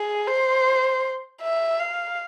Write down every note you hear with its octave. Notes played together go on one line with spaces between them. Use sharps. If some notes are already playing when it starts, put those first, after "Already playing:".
Already playing: G#4
C5
E5
F5